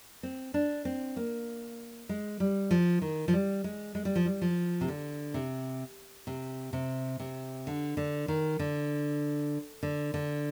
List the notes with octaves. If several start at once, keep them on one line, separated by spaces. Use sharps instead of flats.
C4
D4
C4
A#3
G#3
G3
F3
D#3
F3
G3
G#3
G#3
G3
F3
G3
F3
C3
D3
C3
C3
C3
C3
D3
D3
D#3
D3
D3
D3